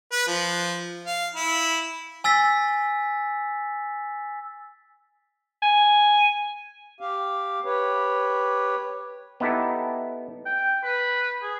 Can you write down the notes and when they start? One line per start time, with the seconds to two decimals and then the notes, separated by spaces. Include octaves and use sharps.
0.12 B4
0.27 F3
1.05 F5
1.35 E4
2.24 G#5 E6 A6 B6
5.62 G#5
7.01 G4 F5
7.65 G4 B4 C#5
9.40 B3 D#4 E4 G4 A4
10.46 G5
10.83 B4
11.43 G#4